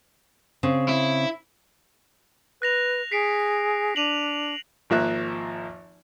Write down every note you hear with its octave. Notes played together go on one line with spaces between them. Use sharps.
C#3 C4
E4
B4 F#6 A#6 F7
G#4 B6 C7 D7
D4 D#7 F7 F#7
G#1 F3 A#3 E5 F#6